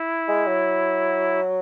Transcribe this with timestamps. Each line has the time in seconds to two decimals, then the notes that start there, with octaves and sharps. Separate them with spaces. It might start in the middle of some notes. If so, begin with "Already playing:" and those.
Already playing: E4
0.28 G#3
0.47 F#3